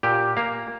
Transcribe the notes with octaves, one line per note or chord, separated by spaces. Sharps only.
A#2 G4
A#3 F5